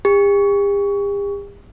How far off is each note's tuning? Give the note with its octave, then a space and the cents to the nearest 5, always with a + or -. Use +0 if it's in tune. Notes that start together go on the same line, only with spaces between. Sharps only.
G4 +45